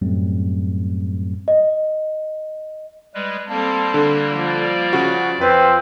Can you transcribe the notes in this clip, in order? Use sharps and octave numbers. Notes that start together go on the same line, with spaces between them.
F#2 A2 F#3 G3 A3 C4
D#5
G3 G#3 B4
G3 A#3 C4 A4 A5
D3
F3 D5
C#3 F#4
F2 F3 C4 B4